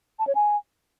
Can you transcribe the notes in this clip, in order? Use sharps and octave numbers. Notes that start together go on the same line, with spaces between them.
A5
C#5
G#5